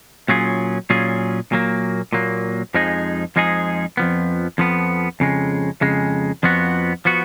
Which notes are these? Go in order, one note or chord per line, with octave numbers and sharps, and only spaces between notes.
A#2 F#3 C#4 F4 G#4
A#2 F#3 C#4 F4 G#4
A#2 F#3 A#3
A#2 F#3 A#3
F2 F3 G#3 D#4 G#4
F2 F3 G#3 D#4 G#4
F2 F3 B3
F2 F3 B3
F2 C#3 G#3
F2 C#3 G#3
F2 F3 B3 F#4
F3 B3 F#4